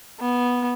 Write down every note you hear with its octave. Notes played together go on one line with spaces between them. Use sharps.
B3